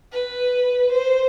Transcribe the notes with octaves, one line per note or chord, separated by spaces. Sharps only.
B4
C5